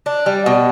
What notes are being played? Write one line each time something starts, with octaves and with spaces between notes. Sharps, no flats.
D4
G3
B2